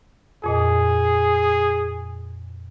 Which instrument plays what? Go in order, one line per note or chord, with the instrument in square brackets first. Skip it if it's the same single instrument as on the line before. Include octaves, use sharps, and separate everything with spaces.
[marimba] F2 A#2 D#5 [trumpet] G#4